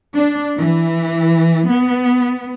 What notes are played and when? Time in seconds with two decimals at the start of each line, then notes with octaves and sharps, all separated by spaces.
0.15 D4
0.58 E3
1.70 B3